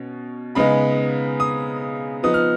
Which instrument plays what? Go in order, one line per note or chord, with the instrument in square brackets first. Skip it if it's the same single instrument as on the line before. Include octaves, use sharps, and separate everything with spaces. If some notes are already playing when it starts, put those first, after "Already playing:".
Already playing: [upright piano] B2 C#4
C#3 G#3 B3 D#4 B5
D#6
F3 B3 D#4 D#6
F6